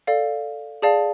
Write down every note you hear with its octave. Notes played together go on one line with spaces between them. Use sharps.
A4 D5 F5
G#4 D5 F5 A5